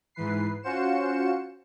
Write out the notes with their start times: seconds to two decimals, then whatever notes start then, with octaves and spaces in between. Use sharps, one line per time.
0.15 G#2 E3 B4 C7
0.63 C#4 F4 F#4 C5 C#7 E7